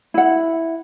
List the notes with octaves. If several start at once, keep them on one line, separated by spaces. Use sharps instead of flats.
E4 F#5